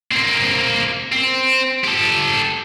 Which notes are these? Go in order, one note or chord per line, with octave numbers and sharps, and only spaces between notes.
A#3 C4
C4
G4 A4